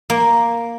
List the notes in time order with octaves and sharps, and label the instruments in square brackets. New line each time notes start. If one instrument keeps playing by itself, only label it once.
[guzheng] A#3